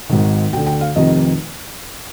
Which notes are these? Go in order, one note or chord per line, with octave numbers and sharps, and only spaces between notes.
G#1 G#2 D#3
D2 D3 G5
G5
F5
F1 F2 C3 D#3 D#5